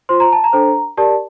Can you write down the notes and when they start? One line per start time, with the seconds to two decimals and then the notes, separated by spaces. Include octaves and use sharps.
0.09 F4 C5 C6
0.20 A#5
0.33 A5
0.44 A#5
0.53 D4 A4 C5
0.97 G4 A#4 D5 A5